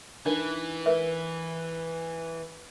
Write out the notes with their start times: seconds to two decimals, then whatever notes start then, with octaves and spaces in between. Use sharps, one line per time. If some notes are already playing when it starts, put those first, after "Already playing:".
0.26 E3 D4 D#4 A#4
0.86 A#4 B4 E5